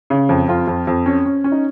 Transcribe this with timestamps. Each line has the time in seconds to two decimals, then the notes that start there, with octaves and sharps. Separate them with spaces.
0.10 C#3
0.29 F2
0.48 F2 F4
0.68 F2
0.87 F2
1.06 C#4
1.26 C#4
1.44 C#4
1.52 D#4